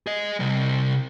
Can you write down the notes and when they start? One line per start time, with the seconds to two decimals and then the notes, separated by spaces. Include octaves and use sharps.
0.07 G#4 D#5
0.40 C3 G3